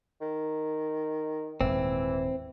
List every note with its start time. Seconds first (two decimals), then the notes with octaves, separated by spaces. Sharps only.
0.21 D#3
1.61 D#1 G#2 E3 C4